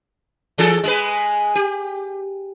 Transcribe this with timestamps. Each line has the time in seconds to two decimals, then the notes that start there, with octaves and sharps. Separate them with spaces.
0.58 E3 G#4 A4
0.84 G#3 G#4 B4
1.55 G4